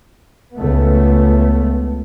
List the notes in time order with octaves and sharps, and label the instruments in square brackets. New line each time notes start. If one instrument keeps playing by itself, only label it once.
[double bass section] C#2 A3 B3